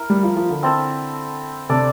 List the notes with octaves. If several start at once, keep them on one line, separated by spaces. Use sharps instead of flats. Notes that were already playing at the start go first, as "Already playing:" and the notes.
Already playing: E4 A#4 E5
G3
F3
F3
D3
C4 E4 A4 E5
C3 D4 A4 D5